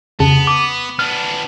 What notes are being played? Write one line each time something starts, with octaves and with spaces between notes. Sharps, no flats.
F2 C#3 B3 A5
D6
B3 D4 F6